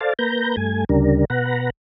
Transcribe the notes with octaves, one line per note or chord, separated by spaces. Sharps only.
A4 C5 D5 F5 A5
A#3 B4 A#5 G6
G2 A3 G#5
D2 C#3 G3 D4 A#4
B2 B4 F#5 A#5